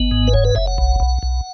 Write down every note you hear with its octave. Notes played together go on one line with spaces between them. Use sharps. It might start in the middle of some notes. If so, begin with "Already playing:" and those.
Already playing: G#1 B3
G#2
B4
F#1 C#5
B4
F#1 E5
F#5
B1
B1
B1